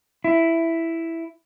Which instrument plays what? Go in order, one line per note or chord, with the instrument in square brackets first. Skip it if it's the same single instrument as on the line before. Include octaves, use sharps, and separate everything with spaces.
[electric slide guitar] E4